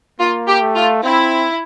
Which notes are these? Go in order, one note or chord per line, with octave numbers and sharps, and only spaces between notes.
A#3 F4
G4
A3
F4
C4 E4